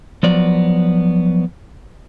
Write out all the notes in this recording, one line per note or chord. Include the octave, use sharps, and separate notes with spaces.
F3 F#3 B3 D5